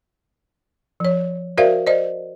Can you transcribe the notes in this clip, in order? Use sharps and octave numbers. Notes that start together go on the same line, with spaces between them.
F3 C#5
F#4 A#4 C5 D5 E5 F5
C5 D5 D#5